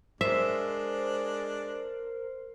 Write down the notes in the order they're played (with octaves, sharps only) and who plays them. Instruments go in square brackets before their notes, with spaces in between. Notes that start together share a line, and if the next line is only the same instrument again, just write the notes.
[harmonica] G#3 D4 [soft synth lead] A#4 [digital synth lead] C5 [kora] E5